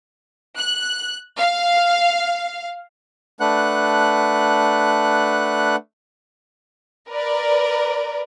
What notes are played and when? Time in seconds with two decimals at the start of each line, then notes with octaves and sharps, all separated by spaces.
0.59 F#6
1.37 F5
3.40 A3 D4 B4 F#5 F#6
7.09 A#4 B4 D5